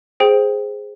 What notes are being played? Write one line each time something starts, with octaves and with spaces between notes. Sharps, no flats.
G#4 C5 G5